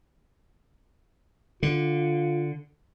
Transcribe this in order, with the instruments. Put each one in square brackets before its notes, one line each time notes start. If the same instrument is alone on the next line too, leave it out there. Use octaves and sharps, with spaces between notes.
[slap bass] D3 [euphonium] F4